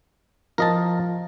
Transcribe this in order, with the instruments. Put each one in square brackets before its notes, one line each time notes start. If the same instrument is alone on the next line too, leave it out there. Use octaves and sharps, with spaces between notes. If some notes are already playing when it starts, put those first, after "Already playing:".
[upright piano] F3 [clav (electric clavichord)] A#4 D#5 A5